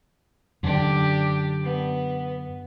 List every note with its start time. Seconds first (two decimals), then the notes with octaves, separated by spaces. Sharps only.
0.63 F#2 D3 D4 G4
1.63 B3